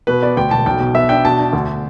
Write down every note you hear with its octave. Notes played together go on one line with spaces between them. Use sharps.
B2 B4
B3 D5
D2 G5
E1 A5
B1 G5
B2
B3 E5
D4 G5
B2 A5
D4
D2